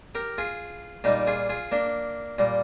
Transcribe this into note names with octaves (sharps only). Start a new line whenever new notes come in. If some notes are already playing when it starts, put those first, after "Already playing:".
G4 A#4
F4 G#4
A#2 G3 D#4 G4
F4 G#4
F4 G#4
A#3 D4
A#2 G3